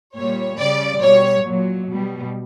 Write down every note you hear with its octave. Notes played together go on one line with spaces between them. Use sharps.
A#2 G3 C#5
C#3 G3 D5
B2 G3 C#5
A#2 F#3
B2 G3